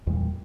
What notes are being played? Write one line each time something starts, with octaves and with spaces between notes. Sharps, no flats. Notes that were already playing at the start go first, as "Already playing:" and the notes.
E2 A#2 G3 G#3